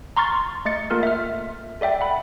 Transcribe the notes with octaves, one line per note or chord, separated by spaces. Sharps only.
A#5 C6 C#6 F6 A6
A3 D#5 A6 C#7
A#3 F4 A4 A#4 C6 F6
E5 F6
A4 D5 E5 G5
F#5 B5